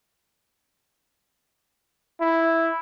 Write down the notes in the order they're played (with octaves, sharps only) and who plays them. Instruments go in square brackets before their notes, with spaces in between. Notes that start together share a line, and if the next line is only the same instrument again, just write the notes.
[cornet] E4